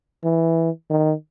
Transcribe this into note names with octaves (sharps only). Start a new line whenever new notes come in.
E3
D#3